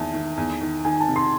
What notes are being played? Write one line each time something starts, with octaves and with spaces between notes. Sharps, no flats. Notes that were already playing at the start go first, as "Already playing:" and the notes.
Already playing: E2 D#3 E5 A5
D#3
E2
D#3
D#3 G#5
A5
C3
C6